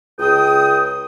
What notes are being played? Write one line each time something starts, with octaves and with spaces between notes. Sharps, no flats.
C#2 G5 D#6